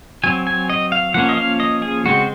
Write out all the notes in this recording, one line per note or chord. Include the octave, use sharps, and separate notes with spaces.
F#3 C4 G#5
G#5
D#5
F5
F3 A#3 C#4 F#5
D#5
F5
D#5
G#4
C#3 G#3 C4 F#4